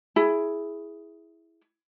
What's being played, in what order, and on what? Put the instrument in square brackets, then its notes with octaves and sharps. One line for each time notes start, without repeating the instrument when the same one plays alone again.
[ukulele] E4 G#4